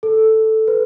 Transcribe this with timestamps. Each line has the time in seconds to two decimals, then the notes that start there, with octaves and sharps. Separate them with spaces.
0.03 A4
0.68 B4